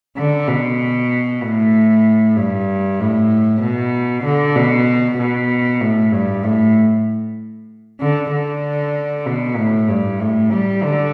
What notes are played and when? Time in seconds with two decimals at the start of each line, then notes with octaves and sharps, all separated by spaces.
0.17 D3
0.48 B2
1.42 A2
2.36 G2
2.99 A2
3.62 B2
4.24 D3
4.56 B2
5.18 B2
5.81 A2
6.13 G2
6.43 A2
8.00 D3
8.32 D3
9.26 B2
9.57 A2
9.88 G2
10.19 A2
10.52 G3
10.83 D3